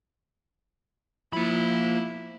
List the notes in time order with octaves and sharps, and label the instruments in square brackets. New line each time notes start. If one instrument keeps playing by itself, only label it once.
[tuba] F3 [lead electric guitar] A#3 B5 [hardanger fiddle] E4